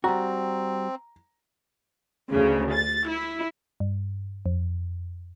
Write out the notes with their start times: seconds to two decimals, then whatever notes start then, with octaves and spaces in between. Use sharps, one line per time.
0.04 G3 C4 F#4 A#5
2.31 D2 C#3
2.75 A6
3.10 E4
3.80 G2
4.46 F2